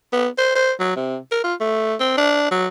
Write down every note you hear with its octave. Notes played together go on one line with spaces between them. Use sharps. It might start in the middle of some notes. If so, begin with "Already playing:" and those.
B3
C5
C5
F#3
C3
A#4
F4
A3
C4
D4
F#3